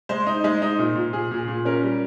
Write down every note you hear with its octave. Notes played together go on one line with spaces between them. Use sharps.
G#3 C5
D#4
G#3
D#4
A#2
A#2
A#2 G#4
A#2
A#2
C#4 A#4
G3